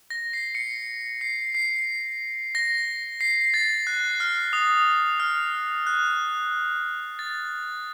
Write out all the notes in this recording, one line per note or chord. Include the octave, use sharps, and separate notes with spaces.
A#6
C7
C#7
C7
C7
A#6
C7
A6
F#6
F6
D#6
F6
F#6
A6